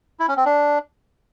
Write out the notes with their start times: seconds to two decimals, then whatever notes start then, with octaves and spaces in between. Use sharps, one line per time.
0.20 E4
0.28 C#4
0.37 C4
0.46 D4